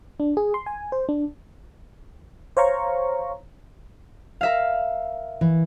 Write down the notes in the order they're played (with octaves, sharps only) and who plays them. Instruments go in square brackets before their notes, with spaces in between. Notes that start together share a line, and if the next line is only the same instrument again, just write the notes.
[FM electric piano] D4
G#4
C6
G#5
C5
D4
C5 C#5 F5 A#5 C#6
[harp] A#4 E5 F5
[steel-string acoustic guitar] E3